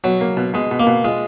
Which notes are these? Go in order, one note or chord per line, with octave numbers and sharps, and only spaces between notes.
B2 F#3
A#3
B2
B2 G#3
B2
A#3
B2
G#3 F4